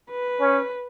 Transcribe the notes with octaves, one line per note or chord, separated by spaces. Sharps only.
B4
C#4